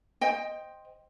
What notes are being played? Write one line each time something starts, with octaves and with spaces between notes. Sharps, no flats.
C5 D#5 G5